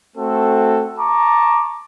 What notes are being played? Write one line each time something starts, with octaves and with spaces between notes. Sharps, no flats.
A3 C4 F#4 A4
A5 A#5 C#6 D6